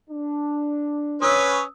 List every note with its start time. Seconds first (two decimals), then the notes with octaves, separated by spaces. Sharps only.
0.10 D4
1.22 C#4 B4 C#5 D#6 E6